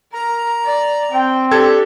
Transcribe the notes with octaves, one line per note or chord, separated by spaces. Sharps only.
A#4 A#5
D5
C4 G5
D4 G4 A4 G#6